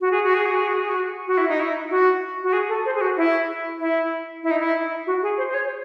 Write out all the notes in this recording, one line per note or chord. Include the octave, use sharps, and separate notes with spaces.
F#4
G#4
F#4
G#4
F#4
G#4
F#4
G#4
F#4
F#4
E4
D#4
E4
F#4
F#4
G#4
A4
C5
G#4
F#4
E4
E4
E4
D#4
E4
F#4
G#4
C5
C5
C#5